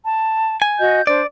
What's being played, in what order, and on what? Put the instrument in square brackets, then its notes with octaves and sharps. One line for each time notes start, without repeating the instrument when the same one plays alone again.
[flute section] A5
[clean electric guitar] G#5
[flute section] F#4 D#5 G6
[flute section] D4 C5 [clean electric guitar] D5